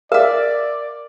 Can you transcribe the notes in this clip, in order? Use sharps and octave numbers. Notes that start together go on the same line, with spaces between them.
A#4 D5 E5 F5